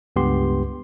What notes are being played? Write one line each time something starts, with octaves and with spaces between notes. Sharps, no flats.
C#2 G2 B3 G4 C6